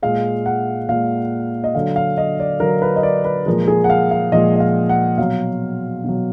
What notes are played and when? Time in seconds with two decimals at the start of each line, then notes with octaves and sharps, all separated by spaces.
0.02 A#2 G#3 F5
0.46 F#5
0.89 A#2 G#3 F5
1.64 D#5
1.75 D3 F#3 F5
1.96 F5
2.18 D#5
2.40 D5
2.60 D3 F#3 A#4
2.82 B4
2.96 D#5
3.03 D5
3.24 B4
3.46 A#2 F3 G#3 A#4
3.68 G#4
3.84 F#5
3.90 F5
4.11 F5
4.32 A#2 F3 G#3 D#5
4.55 D#5
4.60 F5
4.89 F#5
5.18 B2 F#3 F5
6.04 B2 F#3